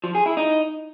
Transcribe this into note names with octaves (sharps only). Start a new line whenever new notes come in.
F3
G#4
E4
D#4